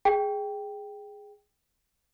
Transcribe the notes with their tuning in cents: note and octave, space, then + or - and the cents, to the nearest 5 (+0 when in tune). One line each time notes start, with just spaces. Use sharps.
G#4 +0 G5 +0